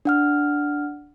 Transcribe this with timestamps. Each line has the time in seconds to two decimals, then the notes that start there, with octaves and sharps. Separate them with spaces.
0.05 D4 F#5 F6